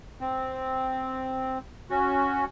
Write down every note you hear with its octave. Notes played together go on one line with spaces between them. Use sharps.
C4
C#4 F#4